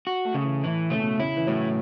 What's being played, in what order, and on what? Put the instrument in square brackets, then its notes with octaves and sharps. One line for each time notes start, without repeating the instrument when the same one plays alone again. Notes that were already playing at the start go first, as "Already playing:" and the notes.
[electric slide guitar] F#4
[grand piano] A3
[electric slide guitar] C#3
[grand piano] E3
[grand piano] A2 [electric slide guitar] E3
[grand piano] C#3 [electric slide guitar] A3
[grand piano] B2
[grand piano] C#3 [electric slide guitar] E4
[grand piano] E3
[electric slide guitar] A2 [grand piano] F#3